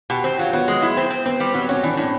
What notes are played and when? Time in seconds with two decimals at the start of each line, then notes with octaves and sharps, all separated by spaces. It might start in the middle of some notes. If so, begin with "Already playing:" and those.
0.10 B2 G4
0.24 C4
0.39 F#3 F4
0.53 F#3 B3
0.68 G#3
0.82 E4
0.97 C4
1.10 C4
1.25 B3 C4
1.40 G3
1.54 F#3 C4
1.69 F#3 C#4
1.83 E3 D4
1.93 C#4
1.97 A2 C4